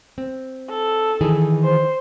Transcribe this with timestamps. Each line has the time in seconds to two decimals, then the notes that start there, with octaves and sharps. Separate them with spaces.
0.18 C4
0.70 A4
1.21 D#3 E3 G#4
1.64 C5